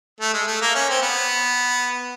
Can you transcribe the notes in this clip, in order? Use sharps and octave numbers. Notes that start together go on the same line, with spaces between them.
A3
G#3
A3
A#3
C#4
C4
B3